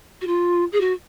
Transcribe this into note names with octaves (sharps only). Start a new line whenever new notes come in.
F#4
F4
G#4
F#4